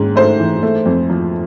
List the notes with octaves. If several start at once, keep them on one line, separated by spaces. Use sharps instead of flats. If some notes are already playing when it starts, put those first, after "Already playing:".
Already playing: G#2 D#3 C#4
A3 C5
E3
A3
F2
F3